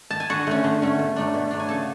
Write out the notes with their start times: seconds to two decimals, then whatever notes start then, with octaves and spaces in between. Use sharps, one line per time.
0.11 A5
0.20 G#5
0.29 D3 F#4 F#5
0.47 A3 C#4
0.64 D3
0.82 A3 C#4
0.99 B2
1.16 F#3 A3 D4
1.34 B2
1.51 F#3 A3 D4
1.60 G#5
1.68 C#3 A4 A5